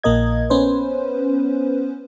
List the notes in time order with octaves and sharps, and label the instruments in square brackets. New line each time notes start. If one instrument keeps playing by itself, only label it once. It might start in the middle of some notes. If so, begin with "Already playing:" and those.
[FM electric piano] A#1 A#2 A#3 A#4 D#5 G#6
B3 C#4 B4 C5